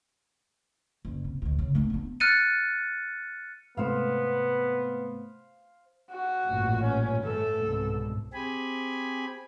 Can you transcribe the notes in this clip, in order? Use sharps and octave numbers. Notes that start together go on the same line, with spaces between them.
F#1
C3
D2 D#3
C#3
A3 D4
B3 D4
F6 F#6 A6 C#7 D#7
G#2 C3 A3 B3 C5 F5
F#4
A1 G2 A#2
C#4
E3 A3 A4
C2 G#2 B2
C4 G4 G#4 G#5 B5